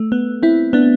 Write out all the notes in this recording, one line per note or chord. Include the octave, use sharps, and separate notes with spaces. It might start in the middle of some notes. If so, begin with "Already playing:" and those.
Already playing: A3
B3
C4 E4
B3 D4